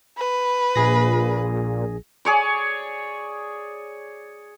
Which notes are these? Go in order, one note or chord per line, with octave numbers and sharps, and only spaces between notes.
B4
A#1 A#2 G#4 A#6
G#4 C#5 D5